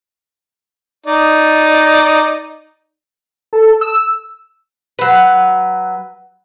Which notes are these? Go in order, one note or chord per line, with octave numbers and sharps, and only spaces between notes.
D#4 D5
A4
E6
F#3 B4